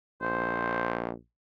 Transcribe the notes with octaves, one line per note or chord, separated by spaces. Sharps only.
A#1 C5